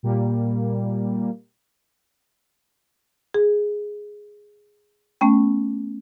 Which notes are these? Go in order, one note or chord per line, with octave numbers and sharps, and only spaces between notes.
A#2 G3 A#3
G#4
A3 B3 C#4 G5